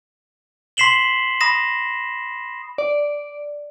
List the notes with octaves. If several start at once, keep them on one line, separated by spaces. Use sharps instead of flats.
C6 B6 C7 E7 F#7 G7
B5 D#6 A#6 E7
D5